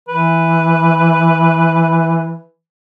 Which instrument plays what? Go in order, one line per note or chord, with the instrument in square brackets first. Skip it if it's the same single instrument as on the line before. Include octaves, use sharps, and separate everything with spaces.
[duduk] E3 [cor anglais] B4